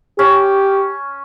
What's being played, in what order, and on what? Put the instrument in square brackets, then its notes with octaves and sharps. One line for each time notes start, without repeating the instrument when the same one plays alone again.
[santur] C#4 [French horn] G4